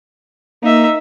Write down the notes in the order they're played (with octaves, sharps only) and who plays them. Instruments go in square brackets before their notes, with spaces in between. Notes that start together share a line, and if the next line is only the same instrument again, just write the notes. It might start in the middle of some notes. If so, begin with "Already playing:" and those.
[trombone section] A#3 [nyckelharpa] D#4 E5